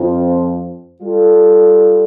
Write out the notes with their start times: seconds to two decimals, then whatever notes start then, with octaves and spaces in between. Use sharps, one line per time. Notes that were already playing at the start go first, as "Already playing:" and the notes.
Already playing: F2 F3 C4 F4 C5
1.02 G3 F4 A4